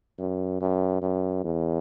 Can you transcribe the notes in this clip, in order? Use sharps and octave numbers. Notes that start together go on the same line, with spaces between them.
F#2
F#2
F#2
E2